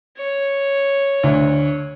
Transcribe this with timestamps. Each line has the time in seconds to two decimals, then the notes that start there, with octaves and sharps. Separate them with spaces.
0.17 C#5
1.23 D2